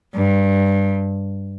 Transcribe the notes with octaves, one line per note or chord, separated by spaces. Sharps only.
G2